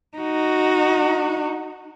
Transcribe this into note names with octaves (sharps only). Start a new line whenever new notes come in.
D#4 F#4